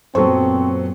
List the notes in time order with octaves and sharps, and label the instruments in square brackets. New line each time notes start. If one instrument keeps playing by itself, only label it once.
[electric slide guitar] F#2 A#2 B3 [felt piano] F#3 A4 C#6 [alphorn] C4 [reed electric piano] C5